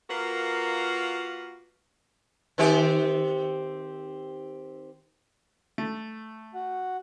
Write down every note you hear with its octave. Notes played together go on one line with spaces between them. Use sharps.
A#3 F4 F#4 A#4 B4
D#3 C4 G4
A3
F#4 F#5